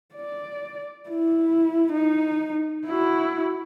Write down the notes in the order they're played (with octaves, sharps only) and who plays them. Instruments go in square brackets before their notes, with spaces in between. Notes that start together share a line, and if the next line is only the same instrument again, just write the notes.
[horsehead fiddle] D5
E4
D#4
E4 F#4